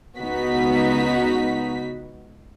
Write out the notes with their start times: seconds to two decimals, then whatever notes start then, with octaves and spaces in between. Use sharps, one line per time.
0.18 C#2 B3 D#4 F#4 B6